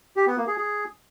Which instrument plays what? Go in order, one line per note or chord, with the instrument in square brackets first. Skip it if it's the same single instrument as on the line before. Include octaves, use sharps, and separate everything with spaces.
[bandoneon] G4
B3
A#3
G#4
G#4